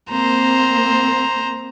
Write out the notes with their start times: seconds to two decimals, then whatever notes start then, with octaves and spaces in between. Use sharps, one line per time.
0.10 A#3 C4 C5 A#5